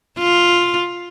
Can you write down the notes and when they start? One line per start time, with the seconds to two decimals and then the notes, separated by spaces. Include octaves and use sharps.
0.19 F4